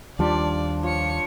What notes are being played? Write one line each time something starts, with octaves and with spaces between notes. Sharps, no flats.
D#2 F3 G3 D4 F4 D5
F3 C#5 C#7